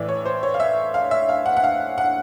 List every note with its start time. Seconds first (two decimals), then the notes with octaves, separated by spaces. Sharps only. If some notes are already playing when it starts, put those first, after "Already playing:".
Already playing: A2 E3 D5
0.09 C#5
0.25 C5
0.43 C#5
0.54 F5
0.60 E5
0.94 F5
1.11 E5
1.29 F5
1.46 F#5
1.57 F#5
1.64 F5
1.98 F#5